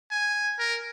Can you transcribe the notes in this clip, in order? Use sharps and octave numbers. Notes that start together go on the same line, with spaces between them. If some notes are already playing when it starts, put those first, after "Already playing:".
G#5
A#4